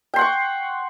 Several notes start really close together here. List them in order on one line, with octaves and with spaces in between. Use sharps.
G5 C6 F#5 C#6